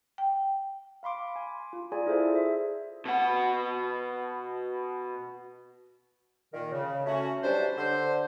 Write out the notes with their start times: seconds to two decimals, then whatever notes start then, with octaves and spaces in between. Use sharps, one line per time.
0.18 G5
1.03 F5 B5 C6 D6
1.36 G#5
1.73 F4
1.92 F4 G#4 D5 G#5 A#5
2.07 E4 G#4 A4 C5 E5
2.35 E5
3.05 B2 F#5
6.53 A#2 D#3 A#4
6.72 C#3
7.06 A3 C#4 F#4
7.43 E3 F#3 G3 D4 C5
7.78 D3 C5